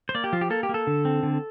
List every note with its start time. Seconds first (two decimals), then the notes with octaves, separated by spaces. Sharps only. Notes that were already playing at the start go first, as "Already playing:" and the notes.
0.09 C5
0.15 A#3 D5
0.24 G4
0.33 F3 F4
0.41 G4
0.50 A#3 A4
0.63 G4
0.69 A#3
0.74 A4
0.87 D3
1.05 C4
1.23 D3